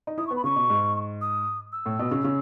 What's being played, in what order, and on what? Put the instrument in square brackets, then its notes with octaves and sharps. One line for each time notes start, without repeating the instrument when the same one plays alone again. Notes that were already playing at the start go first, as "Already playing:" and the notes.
[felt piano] D#4
[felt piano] E4 [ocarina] D#6
[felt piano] B3 [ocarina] C#6
[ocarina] B5
[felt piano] C#3 [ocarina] C#6
[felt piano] B2
G#2
[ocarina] D#6
E6
[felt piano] A2
B2
C#3
C#3